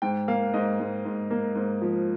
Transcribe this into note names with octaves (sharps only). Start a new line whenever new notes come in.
G#2 G5
A#3 F5
G#2 D#5
G#2
G#2
A#3
G#2
F3